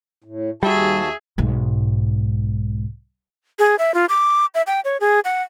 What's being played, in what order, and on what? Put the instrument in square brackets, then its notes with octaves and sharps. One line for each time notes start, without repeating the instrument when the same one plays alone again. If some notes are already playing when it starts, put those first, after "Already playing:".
[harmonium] A2
[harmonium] D#2 F#4 A5 [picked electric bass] G3 [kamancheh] G#4 E5
[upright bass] B1 G#2
[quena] G#4
E5
F4
D6
E5
G5
C#5
G#4
F#5